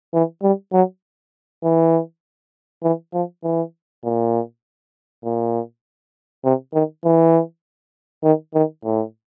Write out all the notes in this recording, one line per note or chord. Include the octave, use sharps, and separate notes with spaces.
E3
G3
F#3
E3
E3
F3
E3
A#2
A#2
C3
D#3
E3
D#3
D#3
A2